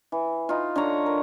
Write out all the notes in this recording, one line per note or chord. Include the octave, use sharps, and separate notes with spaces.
E3
D#4 F4
D3 D4 C#5 A#5
A#4